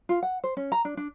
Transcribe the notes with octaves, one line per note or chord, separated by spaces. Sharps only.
F4
F#5
C5
C#4
A#5
D4
D4